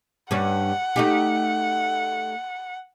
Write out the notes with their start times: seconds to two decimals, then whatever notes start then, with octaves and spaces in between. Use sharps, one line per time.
0.31 G2 G3 C#4 F#5
0.96 A3 D#4 G4